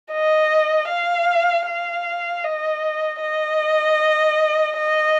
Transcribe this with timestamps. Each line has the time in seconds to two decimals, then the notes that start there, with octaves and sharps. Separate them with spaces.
0.12 D#5
0.90 F5
1.66 F5
2.44 D#5
3.21 D#5
4.77 D#5